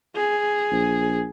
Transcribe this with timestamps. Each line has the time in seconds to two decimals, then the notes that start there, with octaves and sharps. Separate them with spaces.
0.16 G#4
0.72 A#1